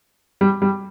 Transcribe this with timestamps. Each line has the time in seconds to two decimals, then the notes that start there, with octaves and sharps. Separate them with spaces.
0.41 G3
0.62 G3